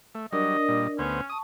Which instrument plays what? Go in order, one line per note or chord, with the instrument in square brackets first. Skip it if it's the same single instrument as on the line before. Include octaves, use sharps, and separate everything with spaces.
[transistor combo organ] A3
[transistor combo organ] F#3 G3 [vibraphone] D4 A#4 D5 [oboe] D#5
[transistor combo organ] A#2 G3
[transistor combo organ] D2 B3 C5 [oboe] C#4
[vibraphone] A5 C#6 [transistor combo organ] D#6